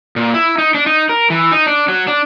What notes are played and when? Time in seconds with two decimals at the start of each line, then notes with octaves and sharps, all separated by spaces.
0.16 A#2
0.34 E4
0.58 D#4
0.74 D4
0.86 D#4
1.09 A#4
1.30 E3
1.51 D#4
1.66 D4
1.88 F#3
2.07 D4